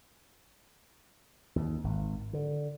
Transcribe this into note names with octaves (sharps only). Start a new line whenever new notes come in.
D#2
G#1
D3